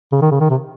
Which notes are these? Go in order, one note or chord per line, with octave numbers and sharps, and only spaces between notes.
C#3
D#3
C#3
D#3
C3